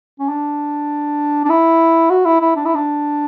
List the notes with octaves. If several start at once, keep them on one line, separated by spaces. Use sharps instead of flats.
C#4
D4
D4
E4
F#4
E4
E4
D4
E4
D4